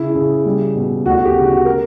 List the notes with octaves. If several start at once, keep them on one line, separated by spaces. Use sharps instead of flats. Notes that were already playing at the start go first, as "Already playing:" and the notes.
Already playing: C#3 E4
C#3
G3
B2
D2 F#4
F#4
G4
C#3
F#4
A#4